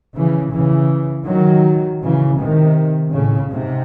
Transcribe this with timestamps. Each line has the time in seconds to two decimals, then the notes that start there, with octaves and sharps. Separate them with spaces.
0.14 C#3 E3
0.52 C#3 E3
1.26 D#3 F#3
2.00 C#3 E3
2.38 C3 D#3
3.12 A2 C#3
3.50 G#2 C3